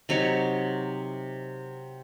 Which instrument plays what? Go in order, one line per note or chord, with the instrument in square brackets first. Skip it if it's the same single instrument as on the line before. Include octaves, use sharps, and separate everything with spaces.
[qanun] C3 F#3 D#4 C#5